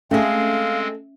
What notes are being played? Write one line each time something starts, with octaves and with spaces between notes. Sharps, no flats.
G#3 A3 C4 C#4 G#4 E5 F5